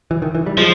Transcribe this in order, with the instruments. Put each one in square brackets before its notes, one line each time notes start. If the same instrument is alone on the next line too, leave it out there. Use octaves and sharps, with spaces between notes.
[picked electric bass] E3
D#3
E3
G3
[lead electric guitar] F3 [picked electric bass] G#3